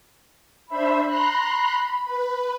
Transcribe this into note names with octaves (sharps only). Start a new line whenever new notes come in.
D4 C5 E5 B5
A#5 C6 F#6
B4